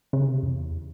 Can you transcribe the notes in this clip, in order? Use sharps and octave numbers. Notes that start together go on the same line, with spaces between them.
C#3
C3
E2